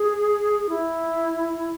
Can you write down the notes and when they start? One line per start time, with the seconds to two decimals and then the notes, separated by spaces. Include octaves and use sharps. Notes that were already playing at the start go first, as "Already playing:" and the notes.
Already playing: G#4
0.69 E4